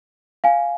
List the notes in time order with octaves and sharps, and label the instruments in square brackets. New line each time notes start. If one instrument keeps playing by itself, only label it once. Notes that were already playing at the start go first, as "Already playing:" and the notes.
[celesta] F5 G#5